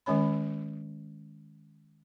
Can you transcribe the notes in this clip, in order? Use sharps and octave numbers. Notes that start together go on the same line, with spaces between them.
D#3 G#3 C#4 C#5 B5